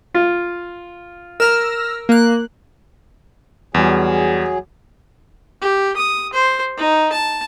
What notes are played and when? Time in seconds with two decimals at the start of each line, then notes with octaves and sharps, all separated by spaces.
0.15 F4
1.40 A#4 E6 F6 A#6
2.09 A#3 F#6
3.74 E2 F#3 G3 G#4
5.61 G4
5.96 D#6
6.33 C5
6.77 D#4
7.12 A5